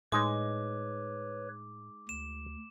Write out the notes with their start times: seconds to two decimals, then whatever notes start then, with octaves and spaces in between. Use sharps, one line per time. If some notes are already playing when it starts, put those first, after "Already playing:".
0.12 A2 G#3 D#4 B4 C#5 D6
2.09 D2 E7